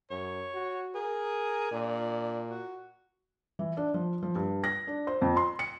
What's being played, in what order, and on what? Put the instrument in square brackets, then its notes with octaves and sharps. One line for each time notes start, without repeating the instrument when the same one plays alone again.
[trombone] F#2 [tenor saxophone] C#5
[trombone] F#4
[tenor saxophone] G#4 [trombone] A#4
[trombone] A#2 [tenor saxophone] D4
[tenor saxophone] F#4
[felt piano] E3
D4
F3
F3
G2
A#6
D4
C5
F2
C6
C#7